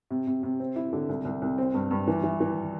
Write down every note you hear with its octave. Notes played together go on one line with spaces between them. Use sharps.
C3
C3
C3
C4
E4
D3
C2
C2
C2
C4
G2
G2
E3
E3
E3